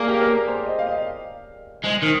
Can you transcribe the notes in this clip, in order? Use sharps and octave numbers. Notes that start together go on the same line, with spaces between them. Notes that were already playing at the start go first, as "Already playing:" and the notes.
Already playing: A#3 G#4 D5
G4
A#4
G#4
C5
D#5
F5
D#5
G#3 C5
D#3